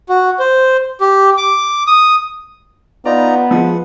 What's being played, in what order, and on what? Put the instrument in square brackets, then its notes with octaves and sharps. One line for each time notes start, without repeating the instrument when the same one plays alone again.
[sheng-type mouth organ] F#4
C5
G4
D6
D#6
[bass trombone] B3 [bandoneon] D#4 F4 A#5 [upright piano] D5
[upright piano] F3 G#3 [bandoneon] F#5